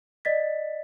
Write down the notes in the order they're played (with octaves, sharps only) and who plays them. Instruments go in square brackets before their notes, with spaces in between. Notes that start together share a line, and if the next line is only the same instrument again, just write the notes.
[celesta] D5 D#5 A6 B6